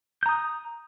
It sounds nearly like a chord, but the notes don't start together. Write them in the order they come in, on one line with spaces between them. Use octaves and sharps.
G6 A#5 D#6